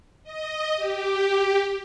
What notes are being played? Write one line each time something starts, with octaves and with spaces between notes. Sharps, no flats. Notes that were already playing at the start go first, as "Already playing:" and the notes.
D#5
G4